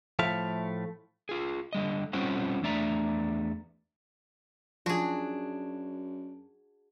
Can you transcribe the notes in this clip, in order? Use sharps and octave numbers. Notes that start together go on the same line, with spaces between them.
A2 F3 A3 E5 F5
F4 G#4
D3 G3 D#5
G3 C4 C#4 F4 C5 F#5
E2 A3 D4 D5 E5 A#5
F#2 F3 D4 F4 F#4 G#4